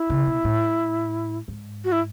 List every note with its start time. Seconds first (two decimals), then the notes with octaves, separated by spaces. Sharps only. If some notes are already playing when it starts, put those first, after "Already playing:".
Already playing: E4
0.10 C#3
0.27 B2
0.44 A2
1.48 G#2
1.84 F#4
1.92 E4